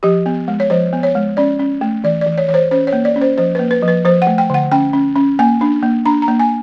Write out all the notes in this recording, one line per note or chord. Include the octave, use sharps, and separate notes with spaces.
F3 G4
B3
G#3
C#5
F3 C5
B3
C#5
G#3
C#4 D5
C#4
A3
E3 D5
D5
E3
C#5
E3 C#5
C5
C#4 C5
C#5
A#3
D5
C#4
C5
F3 C5
B4
A#3
B4
F3 B4
F3 C5
F#5
A3
G5
D3 F#5
C#4 G5
C#4
C#4
A#3 G#5
D4
A#3
D4 A#5
A#5
A#3
G#5